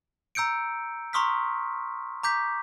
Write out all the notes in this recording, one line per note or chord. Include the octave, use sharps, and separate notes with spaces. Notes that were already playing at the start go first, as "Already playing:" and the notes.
A#5 E6 G6 C#7 D7
A#5 C6 C#6 D#6 F6 B6
A#5 D6 G6 B6